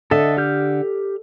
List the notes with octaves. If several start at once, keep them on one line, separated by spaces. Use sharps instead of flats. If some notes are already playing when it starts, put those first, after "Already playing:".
D3 A4 D#5 E5
G4 F6 G6